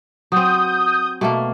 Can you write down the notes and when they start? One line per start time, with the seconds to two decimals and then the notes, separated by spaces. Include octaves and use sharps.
0.32 F#3 C4 D#6 G6
1.21 B2 A3 A#3